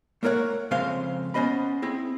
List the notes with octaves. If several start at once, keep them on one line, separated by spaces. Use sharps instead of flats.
A3 A#3 A#4 C#5 F#5
F2 C#3 G#3 C4 C5 F5
B3 C#4 C5 D#5 B5
C4 E4 G#4